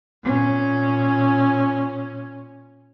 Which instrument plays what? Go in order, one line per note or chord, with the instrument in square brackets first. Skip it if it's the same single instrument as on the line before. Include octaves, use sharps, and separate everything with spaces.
[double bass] A#2 C#4